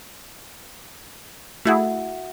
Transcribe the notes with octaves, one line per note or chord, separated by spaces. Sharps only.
A3 E4 F#4 G#4 E5 F#5